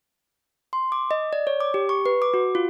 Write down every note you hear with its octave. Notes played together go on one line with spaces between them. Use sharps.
C6
D6
D#5
D5
C#5
D6
G4
C#6
B4
D6
F#4
F4